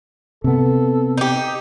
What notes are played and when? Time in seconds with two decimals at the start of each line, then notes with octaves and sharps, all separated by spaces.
0.44 C3 B3 A4
1.18 D#4 G4